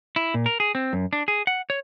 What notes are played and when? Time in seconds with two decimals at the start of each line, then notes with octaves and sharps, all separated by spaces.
0.16 E4
0.34 A#2
0.46 A#4
0.60 G#4
0.75 C4
0.93 F#2
1.13 D4
1.28 G#4
1.47 F#5
1.70 C#5